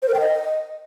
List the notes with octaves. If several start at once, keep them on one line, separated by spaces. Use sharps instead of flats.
C5
A#4
G5
D#5